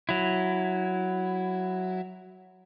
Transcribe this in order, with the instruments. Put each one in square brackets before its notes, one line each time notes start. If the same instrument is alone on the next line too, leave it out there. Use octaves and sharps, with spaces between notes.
[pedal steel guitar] F#3 E4